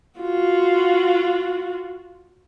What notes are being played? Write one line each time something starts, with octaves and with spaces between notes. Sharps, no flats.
F4 F#4